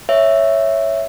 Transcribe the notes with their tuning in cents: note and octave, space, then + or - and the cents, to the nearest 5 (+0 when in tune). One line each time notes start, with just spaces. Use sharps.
C#5 +0 E5 +0